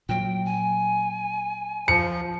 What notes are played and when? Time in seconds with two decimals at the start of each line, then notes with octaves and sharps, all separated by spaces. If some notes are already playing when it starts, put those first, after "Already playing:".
0.09 A#2 F#3 G5
0.45 G#5
1.88 F3 C#7